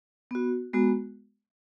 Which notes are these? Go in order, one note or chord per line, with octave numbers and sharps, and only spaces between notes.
B3 F#4
G#3 B3 F#4